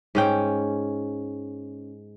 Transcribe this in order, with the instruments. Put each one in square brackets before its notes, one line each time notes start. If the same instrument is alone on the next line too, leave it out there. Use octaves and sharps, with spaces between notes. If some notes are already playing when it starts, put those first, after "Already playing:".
[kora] G#2 C#4 G5